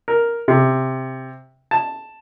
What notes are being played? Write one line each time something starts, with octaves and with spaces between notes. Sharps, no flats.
A#4
C3
A5